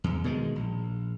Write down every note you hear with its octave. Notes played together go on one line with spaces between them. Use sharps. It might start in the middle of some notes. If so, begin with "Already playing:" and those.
E2
B2 D#3 F3 G#3
A#1